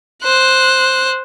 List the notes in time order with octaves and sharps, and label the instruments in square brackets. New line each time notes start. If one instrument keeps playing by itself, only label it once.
[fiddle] C5 F#6